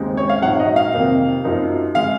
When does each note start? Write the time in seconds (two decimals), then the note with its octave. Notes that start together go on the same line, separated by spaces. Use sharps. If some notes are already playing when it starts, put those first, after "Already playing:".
Already playing: D#2 C#3 G#3 C4 D#4
0.17 C#5
0.29 F5
0.42 A#1 G#2 F#3 F#5
0.59 D#5
0.76 F5
0.93 F2 C3 D#3 A#3 D#4
1.44 F#2 F3 A#3 D#4
1.95 C#3 G#3 C#4 F5